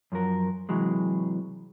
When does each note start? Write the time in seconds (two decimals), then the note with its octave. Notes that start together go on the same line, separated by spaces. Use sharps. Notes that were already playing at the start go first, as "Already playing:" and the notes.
0.12 F#2 F3 F#3 A#4
0.69 C3 E3 F#3 G#3